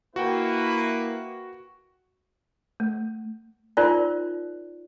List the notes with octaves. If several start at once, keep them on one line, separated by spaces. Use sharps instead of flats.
A#3 E4 F#4 B4 F#5 G5
A3
D#4 F4 A#4 C5 D5